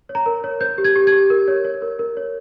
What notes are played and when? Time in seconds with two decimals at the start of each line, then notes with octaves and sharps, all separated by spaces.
0.09 C#5
0.15 A#5
0.26 A#4
0.44 C#5
0.61 C5 G6
0.78 G4
0.84 G#6
0.96 G4
1.07 G#6
1.12 G4
1.30 A#4
1.48 C#5
1.65 C#5
1.82 A#4
1.99 A#4
2.17 C#5